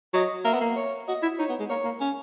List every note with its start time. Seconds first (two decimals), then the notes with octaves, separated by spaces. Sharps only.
0.14 F#3 D#5
0.45 A#3 E5
0.54 B3
0.61 A#3
0.76 C#5
1.08 F#4 D#5
1.23 E4
1.39 D#4 C#5
1.50 B3
1.60 G#3
1.69 A#3 C#5
1.85 A#3
2.01 C#4